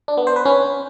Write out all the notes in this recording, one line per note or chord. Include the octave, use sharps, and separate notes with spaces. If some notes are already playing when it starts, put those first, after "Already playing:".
D4
B3
C5
B4
C#4